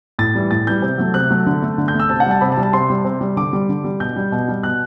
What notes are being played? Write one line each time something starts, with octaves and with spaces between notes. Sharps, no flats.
A2 A6
E3 G3
A2 A6
E3 G3 G6
C3
F#3 A3
C3 F#6
F#3 A3
D3
A3
D3
G6
A3
E6
C3 A5
F#5
G3 A5
C3 B5
A5
G3
A5
C3 C6
G3
C3
G3
D3 D6
G3
D3
G3
B2 G6
G3
B2
G3
B2 F#6